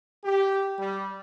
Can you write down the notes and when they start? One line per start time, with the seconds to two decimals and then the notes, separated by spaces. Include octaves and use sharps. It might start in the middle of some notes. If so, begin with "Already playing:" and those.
0.24 G4
0.79 G3